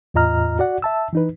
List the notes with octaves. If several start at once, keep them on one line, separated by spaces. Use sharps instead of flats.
E2 A2 F4 D#5 A#5 F6
F#4 D5 F#5
E5 A5 E6
E3 D#4 B4